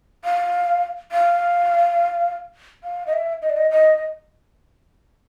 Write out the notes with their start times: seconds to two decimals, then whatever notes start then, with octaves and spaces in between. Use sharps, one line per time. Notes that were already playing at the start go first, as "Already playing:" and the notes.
0.25 F5
1.12 F5
2.84 F5
3.07 D#5
3.13 E5
3.42 D#5
3.49 D5
3.57 D#5
3.70 D#5